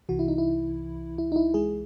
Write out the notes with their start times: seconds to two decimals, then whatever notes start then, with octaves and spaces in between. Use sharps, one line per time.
0.09 C2 C3 E3 F#4
0.19 E4
0.28 D#4
0.38 E4
1.18 E4
1.32 D#4
1.36 E4
1.54 G#3 G#4